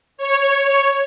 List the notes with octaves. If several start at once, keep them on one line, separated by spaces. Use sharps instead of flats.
C#5